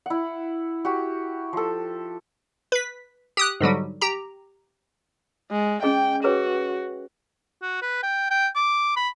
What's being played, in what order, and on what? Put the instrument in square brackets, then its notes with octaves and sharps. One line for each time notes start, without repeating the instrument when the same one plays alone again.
[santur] E4 F#5
F#4 G4
F3 A4
[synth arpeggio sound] B4 B6
G4 D#6 F#6
G#2 D3 F#3 G3
G4 A#5
[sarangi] G#3
[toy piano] C#4 G#4 D#5 [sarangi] G5
[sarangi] F#4 [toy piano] G#4 B4 C#5
[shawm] F#4
B4
G5
G5
D6
B5